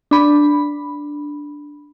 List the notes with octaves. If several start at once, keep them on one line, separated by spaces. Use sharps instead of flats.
D4 B5